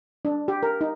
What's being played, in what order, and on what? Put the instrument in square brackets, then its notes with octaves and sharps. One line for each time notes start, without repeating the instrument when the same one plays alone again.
[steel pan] D4
G4
A#4
D#4